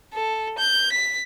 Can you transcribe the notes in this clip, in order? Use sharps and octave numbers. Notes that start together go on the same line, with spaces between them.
A4
G6
B6